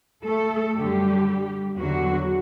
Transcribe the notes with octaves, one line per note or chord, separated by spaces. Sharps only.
A3 A4
F#2 D3 G3 G4
E2 D3 F#3 F#4